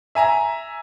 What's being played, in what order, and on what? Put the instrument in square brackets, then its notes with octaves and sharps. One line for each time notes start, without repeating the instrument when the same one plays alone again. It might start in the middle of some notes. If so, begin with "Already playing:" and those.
[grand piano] E5 G#5 A#5